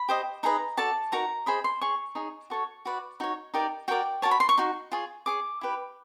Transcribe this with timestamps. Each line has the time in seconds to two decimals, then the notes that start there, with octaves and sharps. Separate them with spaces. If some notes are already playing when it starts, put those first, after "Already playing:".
Already playing: B5
0.09 G4 C5 D#5
0.43 D#4 G#4 B4 D#5 A#5
0.77 F#4 A4 D5 A5
1.12 D#4 F#4 A#4 A#5
1.46 G#4 C5 D#5 B5
1.64 C6
1.81 G#4 C#5 C#6
2.15 D#4 G#4 C#5
2.50 F#4 A4 C#5 C#6
2.85 F#4 B4 D5
3.20 D#4 F#4 C#5
3.54 D#4 G4 A#4 D5
3.88 F#4 A#4 D5 G5
4.22 F#4 A#4 C#5 A5
4.31 B5
4.40 C6
4.49 C#6
4.58 D#4 F#4
4.92 F4 G#4 C#5
5.26 G#4 C#5 D6
5.61 E4 G4 B4